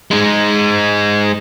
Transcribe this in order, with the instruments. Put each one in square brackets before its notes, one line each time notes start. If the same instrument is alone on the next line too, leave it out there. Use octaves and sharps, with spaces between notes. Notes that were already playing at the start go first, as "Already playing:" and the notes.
[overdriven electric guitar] G#3 D#4